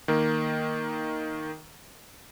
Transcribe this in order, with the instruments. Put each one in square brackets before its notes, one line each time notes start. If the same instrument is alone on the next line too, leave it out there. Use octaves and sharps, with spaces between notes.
[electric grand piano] D#3 A#3